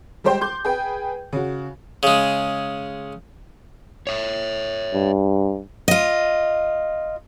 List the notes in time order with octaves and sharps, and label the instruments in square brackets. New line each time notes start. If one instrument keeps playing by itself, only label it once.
[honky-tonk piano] G3 G#3 G4 C5 G5 C6
C6 D6 G6
G#4 B4 G5
C#3 F#4
[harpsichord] C#3 G#3
[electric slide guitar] C#5 E5
[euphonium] G2
[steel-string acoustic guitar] F4 D#5